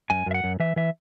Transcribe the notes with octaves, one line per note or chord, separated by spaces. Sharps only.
F#2 G#5
F#2 E5
F#5
F#2
E3 E5
E3 E5